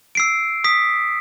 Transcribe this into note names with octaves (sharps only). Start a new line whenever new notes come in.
E6 C7 D7
D#6 B6